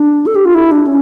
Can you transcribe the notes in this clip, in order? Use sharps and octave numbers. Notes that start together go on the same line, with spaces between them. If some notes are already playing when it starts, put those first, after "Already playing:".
Already playing: D4
A4
G4
F4
E4
D4
C#4